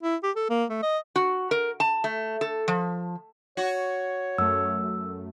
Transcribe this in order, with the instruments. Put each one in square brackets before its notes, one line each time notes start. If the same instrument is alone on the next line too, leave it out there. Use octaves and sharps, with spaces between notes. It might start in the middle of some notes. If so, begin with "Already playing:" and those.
[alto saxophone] E4
G4
A4
A#3
A3
D#5
[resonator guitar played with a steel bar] F#4
A#4
A5
A3
A4
F3
[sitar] F#4 [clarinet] C#5
[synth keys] F#2 A3 [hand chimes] E6